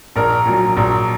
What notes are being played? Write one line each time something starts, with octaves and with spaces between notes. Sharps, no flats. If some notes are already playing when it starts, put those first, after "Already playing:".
A#1 A#4
A#2 F#3
A#1